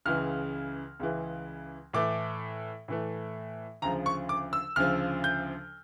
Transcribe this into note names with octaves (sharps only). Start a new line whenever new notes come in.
C#2 C#3 E3 F6
C#2 C#3 E3
A2 E3 A3 D6
A2 E3 A3
D2 C#3 F3 A#5
C#6
D6
E6
D2 C#3 F3 F6
G6